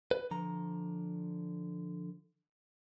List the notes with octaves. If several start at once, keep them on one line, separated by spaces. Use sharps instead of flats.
B4
D3 F3 A#5